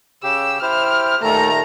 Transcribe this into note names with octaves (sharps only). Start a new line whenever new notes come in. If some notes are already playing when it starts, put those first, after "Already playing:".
C#3 G4 E6
E4 G4 C5 F6
D#2 A#2 D#3 A3 A#5